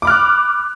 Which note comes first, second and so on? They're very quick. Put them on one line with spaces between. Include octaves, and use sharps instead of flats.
D6 B5 F6 F#6